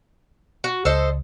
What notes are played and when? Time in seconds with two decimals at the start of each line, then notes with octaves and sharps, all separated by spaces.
0.64 F#4
0.85 C#2 A4 C5 D#5